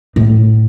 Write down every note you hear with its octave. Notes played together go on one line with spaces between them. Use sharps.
A2